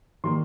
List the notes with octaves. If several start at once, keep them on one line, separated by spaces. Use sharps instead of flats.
D#3 G3 A#3 C6